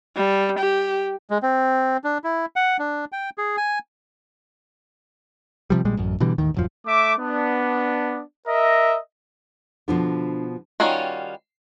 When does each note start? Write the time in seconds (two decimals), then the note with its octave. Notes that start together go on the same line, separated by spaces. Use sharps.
0.16 G3
0.59 G4
1.30 G#3
1.42 C4
2.04 D4
2.24 E4
2.56 F#5
2.79 D4
3.12 G5
3.38 G#4
3.57 G#5
5.70 C3 F3 G3
5.85 A#1 A#2 G3 G#3
5.97 A1 F#2
6.20 B2 D3 E3 G3
6.38 A1 D#2 D#3
6.54 D#1 F#2 F3
6.86 A3 E5 D6
7.19 B3 D4
8.47 A#4 D#5 E5
9.88 B2 D3 F3 B3
10.80 D#3 G3 C#4 F4 F#4